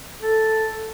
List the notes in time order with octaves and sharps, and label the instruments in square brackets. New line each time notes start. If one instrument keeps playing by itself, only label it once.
[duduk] A4